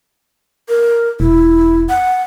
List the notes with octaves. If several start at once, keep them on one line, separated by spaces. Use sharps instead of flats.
A#4
E1 E4
F#5